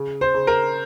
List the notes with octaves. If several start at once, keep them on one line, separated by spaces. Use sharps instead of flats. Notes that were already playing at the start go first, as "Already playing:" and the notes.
Already playing: C#3
C5
C#3
A#4